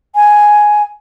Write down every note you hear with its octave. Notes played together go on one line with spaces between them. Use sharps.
G#5